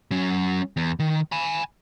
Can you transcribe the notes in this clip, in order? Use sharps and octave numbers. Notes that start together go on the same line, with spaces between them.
F#3 C#4
E2
D#3
G#5 B5